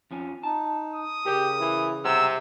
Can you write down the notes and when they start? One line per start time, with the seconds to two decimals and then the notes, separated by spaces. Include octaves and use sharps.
0.11 F2 F3 C#4
0.43 D#4 A5
0.93 D#6
1.26 C#3 G4 A#4 C#5
1.60 E3
2.05 G2 C3 F#5 A#5 E6